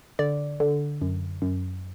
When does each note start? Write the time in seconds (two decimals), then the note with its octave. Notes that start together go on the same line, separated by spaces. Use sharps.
0.19 D3 D5
0.60 D3
1.02 F#2
1.42 F#2